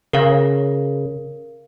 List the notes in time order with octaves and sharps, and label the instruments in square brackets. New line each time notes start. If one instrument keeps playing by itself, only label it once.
[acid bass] C#3 [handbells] A#4 F5